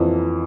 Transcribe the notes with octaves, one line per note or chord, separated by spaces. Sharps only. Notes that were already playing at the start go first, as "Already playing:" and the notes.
Already playing: F2 E3